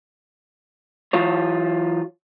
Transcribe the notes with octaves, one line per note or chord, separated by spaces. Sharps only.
E3 F#3 F4 C#5